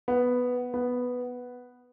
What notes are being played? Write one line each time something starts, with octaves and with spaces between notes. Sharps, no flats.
B3
B3